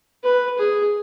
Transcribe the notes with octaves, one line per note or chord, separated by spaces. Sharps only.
B4
G#4